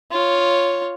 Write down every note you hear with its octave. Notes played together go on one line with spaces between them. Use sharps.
F4 C#5